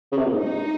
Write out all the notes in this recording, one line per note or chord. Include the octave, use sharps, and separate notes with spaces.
C#3
C3
A#2
G#2
G2 D#4